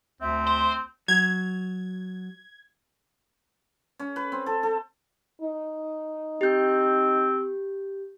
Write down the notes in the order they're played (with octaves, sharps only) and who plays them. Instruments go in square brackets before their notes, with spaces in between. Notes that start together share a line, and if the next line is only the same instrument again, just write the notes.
[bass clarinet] D2 [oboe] C4 [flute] E5
[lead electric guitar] C5
[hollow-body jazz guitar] F#3 [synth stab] G#6
[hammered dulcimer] C#4
B4
C4
A4
A4
[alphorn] D#4
[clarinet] C4 [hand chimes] G4 G6